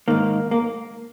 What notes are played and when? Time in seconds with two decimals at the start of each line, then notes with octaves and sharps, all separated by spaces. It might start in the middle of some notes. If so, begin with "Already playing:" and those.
0.08 G#2 D#3 A#3
0.51 A#3